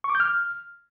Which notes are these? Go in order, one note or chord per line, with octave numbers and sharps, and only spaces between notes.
C#6
D6
G6
F6